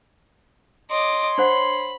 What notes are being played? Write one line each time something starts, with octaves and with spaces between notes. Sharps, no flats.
C#5 D#5 C6 D6
D4 C5 F#5 B5